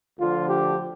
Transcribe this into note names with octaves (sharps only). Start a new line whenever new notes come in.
D2 D3 F3 F4
G4